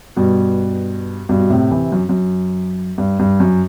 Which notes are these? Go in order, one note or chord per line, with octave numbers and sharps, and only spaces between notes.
G2 B2
G2 B2
B2
A2 C3
C3 E3
F#2
F#2
G2
G2
F#2